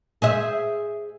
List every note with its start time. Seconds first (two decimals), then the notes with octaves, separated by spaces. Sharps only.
0.22 G#4 C5 E5